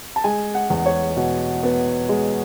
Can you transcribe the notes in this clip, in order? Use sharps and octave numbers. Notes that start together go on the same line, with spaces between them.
A5
G#3 G#5
F#5
E2
C#5
B2
B3
G#3